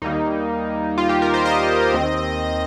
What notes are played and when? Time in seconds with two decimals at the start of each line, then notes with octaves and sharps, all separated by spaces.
0.02 D#2 D#3 G3 A#3 D#4
0.98 F4
1.09 G4
1.22 A#4
1.34 C5
1.45 D#5
1.94 D#2 D#3 C4